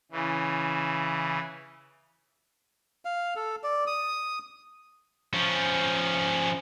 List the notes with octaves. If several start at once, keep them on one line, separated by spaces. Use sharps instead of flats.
C#3 E3
F5
A4
D5
D#6
F3 C#4